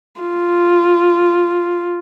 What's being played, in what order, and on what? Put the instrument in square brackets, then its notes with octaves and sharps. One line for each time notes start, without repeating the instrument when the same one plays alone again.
[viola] F4